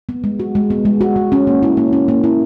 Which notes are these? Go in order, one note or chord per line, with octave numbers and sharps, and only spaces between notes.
B3
G#3
F#4
G#3
B3
G#3
F#4
G#3
C#4
A#3
E4
A#3
C#4
A#3
E4